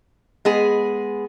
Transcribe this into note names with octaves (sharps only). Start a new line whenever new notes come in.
G#3 B3 G#4